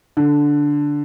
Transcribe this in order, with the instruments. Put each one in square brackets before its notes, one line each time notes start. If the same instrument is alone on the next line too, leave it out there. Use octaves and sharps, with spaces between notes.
[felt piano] D3